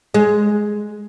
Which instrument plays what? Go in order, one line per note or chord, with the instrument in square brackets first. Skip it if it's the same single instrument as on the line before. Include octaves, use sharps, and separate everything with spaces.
[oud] G#3